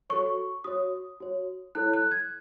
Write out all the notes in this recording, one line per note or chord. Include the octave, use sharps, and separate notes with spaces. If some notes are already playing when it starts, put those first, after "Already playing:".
F#4 A4 C#5 C#6
F#4 C#5 D#6
F#4 C#5
E4 A4 C#5 F#6
F#6
G#6